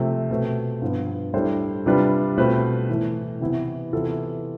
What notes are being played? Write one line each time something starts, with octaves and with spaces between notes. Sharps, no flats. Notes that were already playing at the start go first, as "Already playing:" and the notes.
Already playing: C3 F3 A3 C4
B2 A3 C4
G2 F3 B3 F4
A2 G3 D4 A4 C5
C3 G3 D4 F4 B4
B2 A3 C4 F4 B4
A2 E3 A3
C3 E3 B3 E4
C3 E3 B3 F4 A4